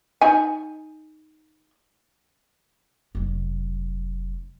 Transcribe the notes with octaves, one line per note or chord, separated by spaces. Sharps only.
D#4 G#5
F1 F#3